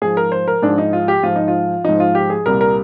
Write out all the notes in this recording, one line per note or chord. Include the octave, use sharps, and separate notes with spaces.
G#2 F3 G#4
A#4
C5
A#4
G#2 F3 D4
D#4
F4
G4
G#2 F3 F4
D#4
F4
G#2 F3 D#4
F4
G4
G#4
C2 A#2 G3 A#4
A#4